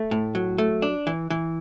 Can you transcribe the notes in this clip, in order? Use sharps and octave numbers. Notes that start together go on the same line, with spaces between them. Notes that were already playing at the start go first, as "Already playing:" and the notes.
Already playing: A3
A2
F#3
A3
D4
E3
E3